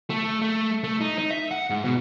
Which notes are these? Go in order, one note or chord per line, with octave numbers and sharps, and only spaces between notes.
A3
A3
A3
D#4
D#4
E5
F#5
G#2
B2